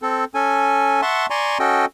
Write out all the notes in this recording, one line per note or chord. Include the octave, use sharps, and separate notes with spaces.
C4 A4
C#4 A4 G#5
E5 F#5 A5 C6 C#6
D5 G#5 A#5 C6 C#6
C#4 F#4 A4 D#5 G5